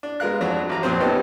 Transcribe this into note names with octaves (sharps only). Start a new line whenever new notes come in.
D4
G#3 B3 A#4 F5 F#6
F2 F#3 D4
A1 A#5
F2 A#2 C4 C5
G3 B3 C#4 D#4 G4 A4